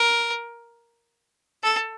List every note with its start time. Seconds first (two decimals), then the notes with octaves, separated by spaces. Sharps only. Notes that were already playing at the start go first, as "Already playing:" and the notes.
Already playing: A#4
1.63 A4